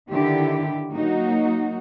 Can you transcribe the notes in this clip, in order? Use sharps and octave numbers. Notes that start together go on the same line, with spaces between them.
D3 D#3 E4 G4
F#3 A#3 D#4 F#4